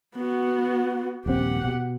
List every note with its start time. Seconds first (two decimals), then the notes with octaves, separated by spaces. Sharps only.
0.16 B3 F#4
1.26 D#1 A#1 C4 G4 F#5
1.65 B2